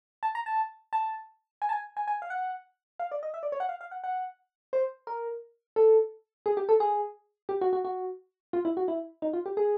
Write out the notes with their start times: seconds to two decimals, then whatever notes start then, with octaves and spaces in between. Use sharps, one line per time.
0.23 A5
0.35 A#5
0.46 A5
0.93 A5
1.62 G#5
1.69 A5
1.73 G#5
1.97 G#5
2.08 G#5
2.22 F5
2.30 F#5
3.00 F5
3.12 D5
3.23 D#5
3.34 E5
3.43 D5
3.52 C#5
3.60 F#5
3.69 F5
3.81 F5
3.91 F#5
4.04 F#5
4.73 C5
5.07 A#4
5.76 A4
6.46 G#4
6.57 G4
6.69 A4
6.80 G#4
7.49 G4
7.61 F#4
7.73 F#4
7.85 F#4
8.53 F4
8.65 E4
8.77 F#4
8.88 E4
9.22 D#4
9.33 F4
9.46 G4
9.57 G#4